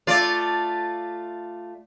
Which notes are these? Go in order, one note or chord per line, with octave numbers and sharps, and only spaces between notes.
A3 F4 D5